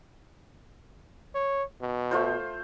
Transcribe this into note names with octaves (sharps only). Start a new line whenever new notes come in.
C#5
B2
A3 F4 C5